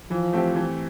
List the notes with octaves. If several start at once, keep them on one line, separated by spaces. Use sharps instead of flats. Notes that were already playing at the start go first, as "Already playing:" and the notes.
E3 F3
A3 C4 G4
E3